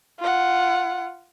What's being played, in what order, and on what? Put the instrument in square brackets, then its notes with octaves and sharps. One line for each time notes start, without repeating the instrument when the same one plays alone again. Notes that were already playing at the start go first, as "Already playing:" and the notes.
[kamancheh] F4 F#5